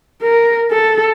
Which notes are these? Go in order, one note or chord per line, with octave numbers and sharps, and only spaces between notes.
A#4
A4